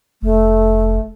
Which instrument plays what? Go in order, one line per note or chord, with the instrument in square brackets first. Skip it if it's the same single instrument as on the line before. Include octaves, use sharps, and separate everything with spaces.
[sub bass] F1 [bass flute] A3